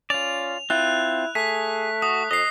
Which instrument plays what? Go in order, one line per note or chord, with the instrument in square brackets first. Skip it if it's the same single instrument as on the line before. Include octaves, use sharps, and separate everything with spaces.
[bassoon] C#4 [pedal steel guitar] F4 D5 [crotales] F7
[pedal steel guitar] C4 F4 [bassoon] E4 [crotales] F#6
[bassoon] A3 [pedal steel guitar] G#4 [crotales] B6
[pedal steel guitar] F#4 [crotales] D#6
[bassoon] F2 [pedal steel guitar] D#5 [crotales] D#6 C7